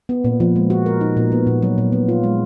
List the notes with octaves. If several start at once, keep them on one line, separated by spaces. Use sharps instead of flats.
B3
A#2
F3
G#3
F#4
A#4
D#4
A#2
B3
A#2
F#3
A#2
B3
F4
G#3